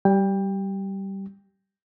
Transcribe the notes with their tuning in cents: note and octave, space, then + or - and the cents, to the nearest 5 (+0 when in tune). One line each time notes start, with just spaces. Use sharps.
G3 -15 G5 +25